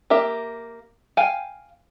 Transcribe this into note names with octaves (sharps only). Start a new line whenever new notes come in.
A#3 G4 E5
F5 G5 G#5